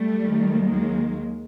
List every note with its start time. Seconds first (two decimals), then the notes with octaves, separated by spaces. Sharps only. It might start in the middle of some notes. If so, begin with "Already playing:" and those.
Already playing: G3 A3
0.25 D#2 D#3 F#3
0.71 G#3 A#3